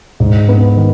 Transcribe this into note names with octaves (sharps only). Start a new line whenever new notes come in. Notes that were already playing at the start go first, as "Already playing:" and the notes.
G#2
B3
D#3